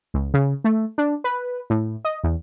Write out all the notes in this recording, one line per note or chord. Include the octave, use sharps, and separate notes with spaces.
C#2
C#3
A3
D4
B4
A2
D#5
E2